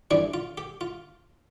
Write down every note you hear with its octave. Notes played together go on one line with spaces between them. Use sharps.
F2 E3 G3 D4
F4
G4
F4